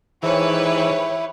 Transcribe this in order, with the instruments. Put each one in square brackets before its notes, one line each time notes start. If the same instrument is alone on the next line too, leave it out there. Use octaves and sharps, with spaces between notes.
[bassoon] G#2 [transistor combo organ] E3 [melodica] E4 [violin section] G4 B4 C#5